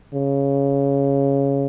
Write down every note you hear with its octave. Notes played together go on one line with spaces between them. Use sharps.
C#3